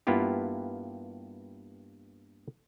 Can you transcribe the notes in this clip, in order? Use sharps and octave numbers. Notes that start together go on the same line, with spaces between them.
G2 A#3 B3 E4 F4 G4